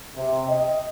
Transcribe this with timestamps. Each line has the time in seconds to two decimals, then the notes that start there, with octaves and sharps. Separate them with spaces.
0.16 C3
0.49 D#5